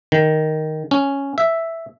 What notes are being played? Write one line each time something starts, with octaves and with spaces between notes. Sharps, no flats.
D#3
C#4
E5